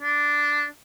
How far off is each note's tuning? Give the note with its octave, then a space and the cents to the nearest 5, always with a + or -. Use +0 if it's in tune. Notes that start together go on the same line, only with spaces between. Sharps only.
D4 -5